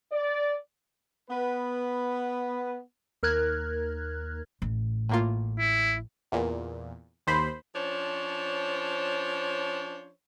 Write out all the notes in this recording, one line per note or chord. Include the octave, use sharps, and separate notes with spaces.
D5
B3 B4
D#2 A#4 F6 F#6 G#6
A1
A2 A#3 F4
E4
E2 A#2
D#2 C5 B5
F3 C#4 D4 C5 C#5